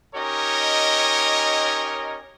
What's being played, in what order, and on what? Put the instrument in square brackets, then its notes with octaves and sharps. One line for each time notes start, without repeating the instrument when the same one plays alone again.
[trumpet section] C#4 D#4 G4 A#4 C#5 D#5